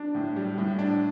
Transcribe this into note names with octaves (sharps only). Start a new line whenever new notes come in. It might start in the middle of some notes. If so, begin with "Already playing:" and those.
Already playing: D4
A2
G3
A2
D4